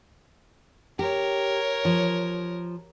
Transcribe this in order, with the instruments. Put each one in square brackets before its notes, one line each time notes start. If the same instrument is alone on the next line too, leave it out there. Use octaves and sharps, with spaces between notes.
[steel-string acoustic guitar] G4 [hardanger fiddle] A#4 C#5
[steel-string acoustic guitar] F3